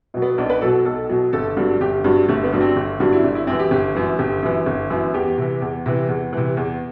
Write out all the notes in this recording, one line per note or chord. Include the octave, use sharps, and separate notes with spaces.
B2 F#3
B3
B1 D4
B4
B2 F#3 A4
B1 A4
B2 F#3
G1 A4
G2 D3 F#3
G1 G4
G2 D3 F#3 F#4
G1 A3
B3
G2 D3 F#3
C4
G1
G2 D3 F#3
E4
G1 D4
E4
F#2 E3 C4
G4
G1
F#2 E3
G1 G4
F#2 E3
G1
F#2 E3
E2 G4
C3 E3
E2
C3 E3
E2
C3 E3
E2